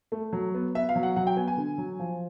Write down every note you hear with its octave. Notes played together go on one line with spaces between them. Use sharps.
A3
F#3
B3
B3 E5
F5
F#3
F#5
F#3 F#5
G5
B3 G#5
G#5
D3
F#3
F3